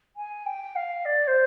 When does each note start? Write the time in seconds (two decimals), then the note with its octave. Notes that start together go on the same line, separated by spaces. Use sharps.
0.16 G#5
0.45 G5
0.75 F5
1.05 D5
1.27 C5